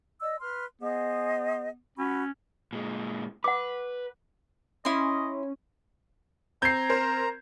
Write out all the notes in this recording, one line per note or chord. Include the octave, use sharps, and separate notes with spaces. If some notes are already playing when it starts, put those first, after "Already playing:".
D5 D#5 E6
B4 C6 F6
B3 G#4 C5 D#5
C#4 F#4 B5 C#6
A#2 G#3
B4 F#5 D6
C#4 E4 D#5 C6
C4 A#5 G6 G#6 C7
A#4 C5